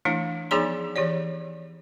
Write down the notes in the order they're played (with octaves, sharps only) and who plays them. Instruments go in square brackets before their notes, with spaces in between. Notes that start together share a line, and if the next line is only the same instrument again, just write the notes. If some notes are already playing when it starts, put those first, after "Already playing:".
[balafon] E3 A3 D4 E4
F3 B3 D#4 G#4 D5 C6
E3 G4 C#5 D5